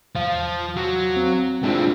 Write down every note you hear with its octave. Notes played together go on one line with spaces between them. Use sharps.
E2 F3 F5
F#3
C4
A2 G#3 C4 D4 F4